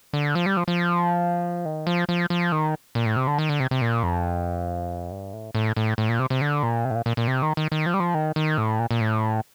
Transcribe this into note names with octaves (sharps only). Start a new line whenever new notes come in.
D3
F3
G3
F3
F3
D#3
F3
F3
F3
D#3
A#2
A2
C3
D3
D#3
D3
C3
C3
A#2
F2
G2
A2
A2
A2
A2
A#2
C3
C3
D3
A#2
C3
A2
A#2
A#2
A#2
C3
D#3
D#3
D#3
F3
G3
F3
D#3
D#3
A2
A#2
A#2
A2